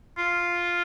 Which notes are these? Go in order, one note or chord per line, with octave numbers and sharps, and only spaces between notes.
F4